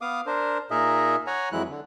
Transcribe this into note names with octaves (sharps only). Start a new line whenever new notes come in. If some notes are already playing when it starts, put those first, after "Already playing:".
B3 F5 D6 D#6
D4 A#4 C5
A#2 D#4 G#4 A#4 D#5 E5
C#5 F#5 G#5 A#5
F2 E3 F#3 G#3 E4 F#6
D3